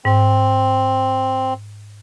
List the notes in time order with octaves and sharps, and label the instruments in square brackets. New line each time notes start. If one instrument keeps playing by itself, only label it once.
[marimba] G#2 [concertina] C4